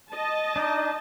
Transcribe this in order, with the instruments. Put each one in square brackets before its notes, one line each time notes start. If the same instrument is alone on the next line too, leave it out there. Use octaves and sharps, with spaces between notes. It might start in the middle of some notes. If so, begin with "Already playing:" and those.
[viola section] D#5 A5
[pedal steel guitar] D4 D#4